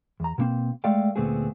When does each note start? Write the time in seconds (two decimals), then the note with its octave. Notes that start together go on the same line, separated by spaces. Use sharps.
0.20 E2 A#5
0.38 B2 D3 A#3 C4
0.84 G#3 A3 A4 D5 F5 G5
1.16 D2 A#2 A3 B3 C4 G#4